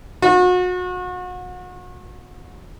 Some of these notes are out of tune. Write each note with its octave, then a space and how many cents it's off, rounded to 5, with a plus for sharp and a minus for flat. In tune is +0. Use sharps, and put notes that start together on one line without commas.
F#4 -35